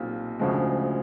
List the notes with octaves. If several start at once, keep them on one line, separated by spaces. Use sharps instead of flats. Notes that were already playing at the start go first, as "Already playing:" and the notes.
Already playing: B1 A#2 G3 C4 F4
D2 C#3 F3 G#3